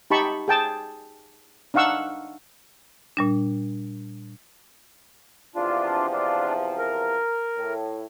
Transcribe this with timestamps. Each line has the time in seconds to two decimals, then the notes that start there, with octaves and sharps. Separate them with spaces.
0.11 D#4 G4 A5 B5 C#6
0.48 G#4 G5 A5
1.74 D4 D#4 F5 F#5 C#6 E6
3.17 A#2 G3 D4
5.56 E2 C3 F3 D4 F4
6.13 D4 F4
6.78 A#4
7.57 A2